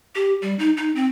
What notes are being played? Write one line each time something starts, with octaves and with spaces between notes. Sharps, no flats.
G4
G3
D#4
D#4
C4